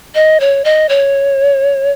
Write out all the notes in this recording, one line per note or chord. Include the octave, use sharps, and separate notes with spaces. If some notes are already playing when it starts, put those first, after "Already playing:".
D#5
C#5
D#5
C#5